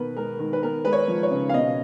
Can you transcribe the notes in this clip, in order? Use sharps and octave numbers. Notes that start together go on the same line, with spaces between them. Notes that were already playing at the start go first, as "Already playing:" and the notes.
Already playing: B2 D#3 B3 A#4 B4
G#3 A#4
D#3
B4
B3 A#4
G#3 B4
C#5
F3
C#5
C#3
F5
B2 D#5